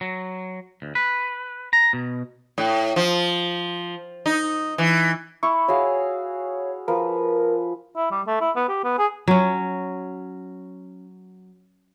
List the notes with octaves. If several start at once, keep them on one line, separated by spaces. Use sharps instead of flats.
F#3
D2
B4
A#5
B2
A2
F3
D#4
E3
E4 C#6
F#4 G#4 C#5 F5
F3 A#4 B4
E4
G3
A3
E4
B3
G4
B3
G#4
F#3 C#4